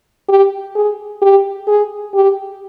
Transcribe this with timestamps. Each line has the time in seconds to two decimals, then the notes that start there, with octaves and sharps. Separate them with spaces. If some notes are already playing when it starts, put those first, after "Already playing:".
0.29 G4
0.75 G#4
1.22 G4
1.67 G#4
2.14 G4